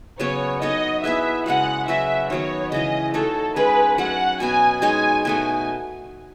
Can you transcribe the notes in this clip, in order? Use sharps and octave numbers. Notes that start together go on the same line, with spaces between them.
C#3 F#3 B3 C#5
B3 D#4 A4 C#5 D#5
B3 E4 G#4 B4 E5
C#3 G#3 B3 F#4 F#5
F#3 C#4 F#4 B4 E5
D#3 F#3 B3 C#5
C#3 E3 G#3 D#5
A3 D#4 F#4 A4 C#5
G#3 C#4 G#4 B4
F#3 A3 C#4 F#5
B2 F#3 B3 G#5
G#3 D#4 G#4 C#5 G#5
B2 A3 D#4 G#5